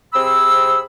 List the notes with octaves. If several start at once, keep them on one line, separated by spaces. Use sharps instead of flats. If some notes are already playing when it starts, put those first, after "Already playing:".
C3 C4 G#4 B5 E6